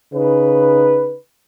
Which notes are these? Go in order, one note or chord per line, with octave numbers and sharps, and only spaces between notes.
C#3 D#4 B4